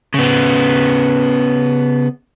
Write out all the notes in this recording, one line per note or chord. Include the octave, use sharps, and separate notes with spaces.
C#3 B3